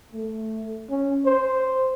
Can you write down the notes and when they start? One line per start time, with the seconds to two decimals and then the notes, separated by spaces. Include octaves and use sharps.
0.12 A3
0.90 C#4
1.25 C5